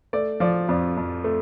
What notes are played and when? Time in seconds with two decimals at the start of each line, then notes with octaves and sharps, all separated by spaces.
0.13 A3 D5
0.40 F3 D5
0.68 F2 D5
0.97 F2
1.24 A3